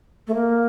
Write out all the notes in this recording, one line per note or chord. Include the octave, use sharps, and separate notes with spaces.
A3
A#3